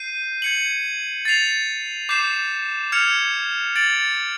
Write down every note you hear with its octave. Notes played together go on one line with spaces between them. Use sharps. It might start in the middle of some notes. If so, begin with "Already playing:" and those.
Already playing: G6 C7 D#7
G#6 C#7 F#7
A6 C7 F7
D6 G6 C7 E7
F6 G#6 C#7 F7
A6 D7 F#7